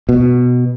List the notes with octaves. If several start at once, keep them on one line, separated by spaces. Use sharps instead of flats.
B2